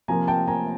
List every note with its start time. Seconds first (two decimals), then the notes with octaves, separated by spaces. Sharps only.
0.08 C3 F3 A#3 G#5 A#5
0.27 G5 A5
0.48 G#5 A#5